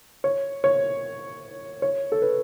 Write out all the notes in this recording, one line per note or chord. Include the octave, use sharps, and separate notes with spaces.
C#5
C#5
C#5
A4
B4